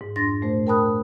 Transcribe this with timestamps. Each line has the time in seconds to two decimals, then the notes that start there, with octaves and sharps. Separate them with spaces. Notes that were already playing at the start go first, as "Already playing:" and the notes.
0.01 G#2
0.16 F2 G#2 D4 C6 A6 A#6
0.42 A#2 A3 C5
0.67 A#4 G5 A5 B5 D#6 F#6